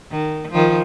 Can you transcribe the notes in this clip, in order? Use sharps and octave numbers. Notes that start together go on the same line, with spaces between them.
D#3
D#3 F3